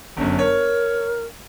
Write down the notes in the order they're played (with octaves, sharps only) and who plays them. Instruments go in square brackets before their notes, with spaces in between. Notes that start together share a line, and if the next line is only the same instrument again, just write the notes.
[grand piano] G1 F#2
[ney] A#4 [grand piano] C#5